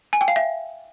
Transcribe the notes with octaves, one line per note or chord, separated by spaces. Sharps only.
G#5
G5
F5
E5